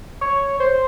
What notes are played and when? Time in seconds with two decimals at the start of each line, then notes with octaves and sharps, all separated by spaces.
0.21 C#5
0.60 C5